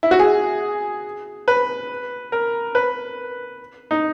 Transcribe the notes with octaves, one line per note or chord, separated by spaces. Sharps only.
E4
F#4
G#4
B4
A#4
B4
D#4